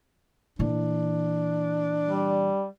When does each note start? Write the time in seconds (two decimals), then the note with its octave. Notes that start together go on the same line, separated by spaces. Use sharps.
0.59 A#2 E3 D4
2.07 G3